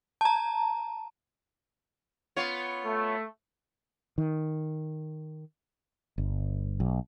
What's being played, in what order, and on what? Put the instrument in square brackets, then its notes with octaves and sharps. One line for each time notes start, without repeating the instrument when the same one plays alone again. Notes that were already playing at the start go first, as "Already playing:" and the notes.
[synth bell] A5 A#5
[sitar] B3 F4 C#5
[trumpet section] A3
[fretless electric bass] D#3
G1
B1